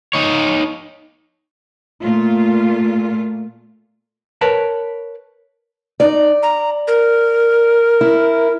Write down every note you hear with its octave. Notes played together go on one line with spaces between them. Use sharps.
D#4 C#5
A#2 A3 F4
A#4 B4 C#5 A5
D#4 D5
A#5
A#4
E4